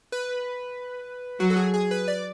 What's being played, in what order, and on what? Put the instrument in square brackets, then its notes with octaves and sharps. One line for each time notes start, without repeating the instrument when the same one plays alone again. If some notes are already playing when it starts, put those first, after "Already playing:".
[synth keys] B4
[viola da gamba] F#3 [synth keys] F#4
[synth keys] A4
G#4
G#4
B4
D5